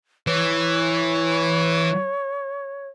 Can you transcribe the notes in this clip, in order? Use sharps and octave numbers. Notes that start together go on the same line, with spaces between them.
E3 C#5